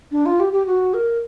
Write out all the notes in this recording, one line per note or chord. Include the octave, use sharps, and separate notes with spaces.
D4
F4
G4
G4
F#4
A#4